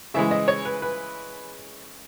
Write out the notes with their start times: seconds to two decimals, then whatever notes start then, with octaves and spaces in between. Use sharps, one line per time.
0.14 C#3 E3 G#3 E5
0.31 D#5
0.48 C#5
0.65 B4
0.82 B4